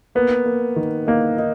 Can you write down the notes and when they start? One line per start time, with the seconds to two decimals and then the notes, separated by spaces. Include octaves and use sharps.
0.15 A#3 B3
0.46 A#3
0.76 D#3
1.07 A#3 D#4
1.38 D#4